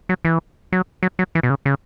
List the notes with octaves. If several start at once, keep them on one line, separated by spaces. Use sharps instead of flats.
F#3
E3
F#3
F#3
F#3
E3
B2
C#3
C#3